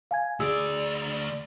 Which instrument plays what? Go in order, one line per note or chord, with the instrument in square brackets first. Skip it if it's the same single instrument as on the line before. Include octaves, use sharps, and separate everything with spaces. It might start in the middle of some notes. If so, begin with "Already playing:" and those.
[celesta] F5 G#5 G#6
[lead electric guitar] D2 D5 [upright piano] G#4 [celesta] E6